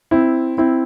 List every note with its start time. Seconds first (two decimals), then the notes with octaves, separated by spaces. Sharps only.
0.11 C4 E4
0.58 C4 E4